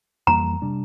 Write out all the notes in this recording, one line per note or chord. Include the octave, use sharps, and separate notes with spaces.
F2 E3 G3 A#3 A#5
C3 G3 D4